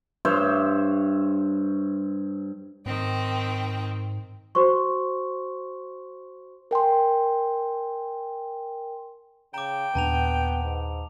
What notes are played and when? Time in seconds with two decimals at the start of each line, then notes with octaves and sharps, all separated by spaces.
0.25 G2 C5 C#5 E5
2.86 G#2 D#3 C4 G5
4.55 F#4 C5 C6 C#6
6.71 A#4 G5 G#5 C6
9.54 C#3 G5 A#5 D6
9.95 D#2 A#2 B3 D4 A5 A#5 F7
10.64 G#2